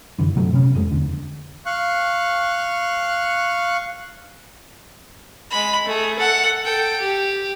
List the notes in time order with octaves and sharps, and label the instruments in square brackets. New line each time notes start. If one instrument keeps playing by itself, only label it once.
[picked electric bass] F#2 D3 E3
F#2 B2 F#3 A3
C3 B3 C#4
E1 F2 G#3 A3
E2 D3
[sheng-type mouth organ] F5 C#6 F#6
[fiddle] G#3 B5
A3 G#4
A4 F#5
A4 G5
G4